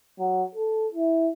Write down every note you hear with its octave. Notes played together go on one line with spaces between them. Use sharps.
F#3
A4
E4